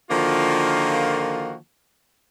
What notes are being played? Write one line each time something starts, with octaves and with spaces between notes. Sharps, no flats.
D3 D#3 F3 A#3 F4 F#4